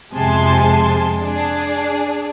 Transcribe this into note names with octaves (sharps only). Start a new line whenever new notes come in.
F2 C3 G#3 G#5 A5 C6
D4 G#4